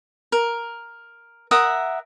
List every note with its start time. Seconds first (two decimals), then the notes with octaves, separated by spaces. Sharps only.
0.32 A#4
1.51 A#4 E5 F#5 D#6